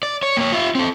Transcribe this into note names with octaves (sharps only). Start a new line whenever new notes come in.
D5
C#5
A#3 C#5
F4 E5
C4 A4